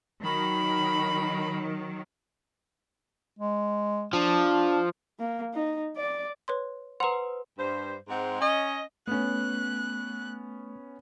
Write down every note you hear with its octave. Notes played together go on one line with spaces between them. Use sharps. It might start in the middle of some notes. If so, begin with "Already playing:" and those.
D#3 F#3 B5
G#3
F3 D4
A#3
D#4
D5
B4 C#5 C6
B4 C5 F#5 A#5 C6
G2 C5
G#2 G#3 C4 G#4 F#5
C#4 D#5
A3 B3 C#4 F#6